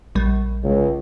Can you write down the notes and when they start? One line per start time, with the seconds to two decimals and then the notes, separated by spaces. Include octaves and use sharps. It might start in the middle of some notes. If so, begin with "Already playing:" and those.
0.15 A#1 G3
0.64 C#2